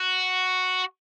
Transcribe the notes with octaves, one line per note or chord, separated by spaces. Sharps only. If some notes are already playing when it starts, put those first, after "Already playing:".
Already playing: F#4